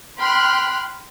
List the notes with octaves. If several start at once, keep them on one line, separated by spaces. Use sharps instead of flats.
G5 B5 C6 F6 F#6